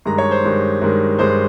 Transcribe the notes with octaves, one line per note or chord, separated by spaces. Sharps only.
G2 D#3 G#3 A#5
C#5
C5
G2 D#3 G#3
G2 D#3 G#3
G2 D#3 G#3 C5